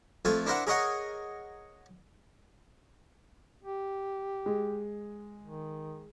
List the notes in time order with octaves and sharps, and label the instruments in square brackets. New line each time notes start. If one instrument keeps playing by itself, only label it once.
[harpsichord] F2 A3 F4 G#5
D4 E4 A#4 C5 E5 F#5
G#4 A#4 C#5 D#5 F#5 G#5
[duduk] G4
[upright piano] G#3
[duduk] D#3